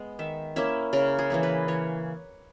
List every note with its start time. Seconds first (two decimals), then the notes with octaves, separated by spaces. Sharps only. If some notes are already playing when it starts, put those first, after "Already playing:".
Already playing: G#3 B3
0.19 D#3 E5
0.56 A#3 C#4 E4 E5
0.93 C#3 A#4
1.19 G#4
1.30 E3 A#3 E4
1.43 B4
1.68 E3 C#5